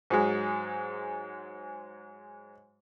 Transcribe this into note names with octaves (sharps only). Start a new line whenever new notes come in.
G#2 F#3 G#3